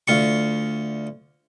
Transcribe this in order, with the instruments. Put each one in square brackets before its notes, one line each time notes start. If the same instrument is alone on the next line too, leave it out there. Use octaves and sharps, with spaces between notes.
[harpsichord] D2 F4 C#6